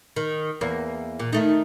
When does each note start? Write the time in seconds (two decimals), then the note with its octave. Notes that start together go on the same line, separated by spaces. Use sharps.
0.16 D#3
0.61 E2 A#3
1.20 A#2
1.33 D#3 A3 D#4